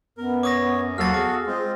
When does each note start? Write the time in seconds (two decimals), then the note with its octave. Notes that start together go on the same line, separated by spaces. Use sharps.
0.18 F#2 B3 A#4
0.43 C#5 D6 D#6 A#6
0.98 D#2 F#3 F#4 A4 F5 F6 A6
1.14 E2 G#4 D6
1.47 G#3 C4 F4